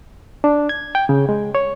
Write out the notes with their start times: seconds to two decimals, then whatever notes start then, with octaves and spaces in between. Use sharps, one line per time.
0.44 D4
0.69 G#6
0.95 G5
1.09 C#3
1.29 G#3
1.55 C#5